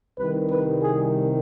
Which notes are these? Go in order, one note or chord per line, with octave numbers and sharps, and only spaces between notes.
C2 C3 D#3 G3 B4
B4
G#4